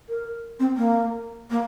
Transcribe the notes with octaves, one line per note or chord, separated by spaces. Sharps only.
A#4
C4
A#3
A#3